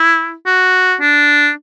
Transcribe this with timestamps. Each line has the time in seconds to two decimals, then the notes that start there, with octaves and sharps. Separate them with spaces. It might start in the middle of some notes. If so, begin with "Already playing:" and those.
Already playing: E4
0.46 F#4
1.01 D4